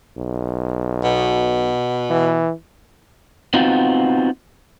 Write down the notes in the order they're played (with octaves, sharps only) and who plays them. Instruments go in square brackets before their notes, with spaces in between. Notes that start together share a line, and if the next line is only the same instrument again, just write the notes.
[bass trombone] B1
[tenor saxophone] B2
[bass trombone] E3
[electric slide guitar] B3 C4 D#4 F4 F#4